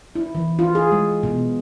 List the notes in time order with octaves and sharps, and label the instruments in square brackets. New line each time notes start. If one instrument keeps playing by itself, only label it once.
[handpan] E4
E3
F4
G#4
G#3
B2